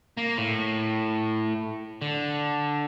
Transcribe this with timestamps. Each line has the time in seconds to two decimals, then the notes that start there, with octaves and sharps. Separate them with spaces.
0.17 A#3
0.37 A2
2.02 D3